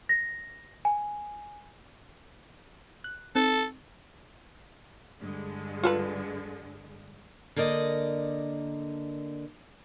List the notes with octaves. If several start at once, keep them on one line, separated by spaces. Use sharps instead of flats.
A#6
G#5
F#6
C4 D#4 A4
G2 D3 G#3
F4 A4 B4
D3 A#3 A#4 D5 D#5